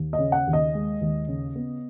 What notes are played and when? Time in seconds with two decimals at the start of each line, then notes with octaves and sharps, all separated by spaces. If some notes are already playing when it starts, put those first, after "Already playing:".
Already playing: D#2
0.13 D#5
0.19 C#3
0.32 F#5
0.47 D#2
0.53 D#5
0.74 G#3
1.01 D#2
1.28 C#3
1.56 B3